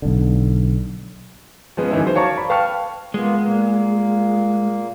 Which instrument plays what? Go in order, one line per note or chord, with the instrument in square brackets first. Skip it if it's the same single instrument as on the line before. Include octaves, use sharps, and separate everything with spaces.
[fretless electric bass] B1 D3
[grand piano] F3 G#3 B3 C#4 F4
F#2 D#3 E3 C#4 D#4 E4
F#4 C5
C#5 D5 F5 A5 A#5 C#6
B5
B4 F5 G5 A5 C#6 F6
[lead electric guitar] G#3 [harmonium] A#3 B3 F4
[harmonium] A#2 A#3